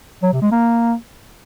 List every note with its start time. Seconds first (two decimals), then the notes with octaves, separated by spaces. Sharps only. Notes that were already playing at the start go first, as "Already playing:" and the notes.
0.23 F#3
0.32 C3
0.42 G#3
0.51 A#3